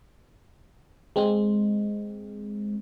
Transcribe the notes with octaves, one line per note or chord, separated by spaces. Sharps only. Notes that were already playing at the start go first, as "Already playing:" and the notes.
G#3 C4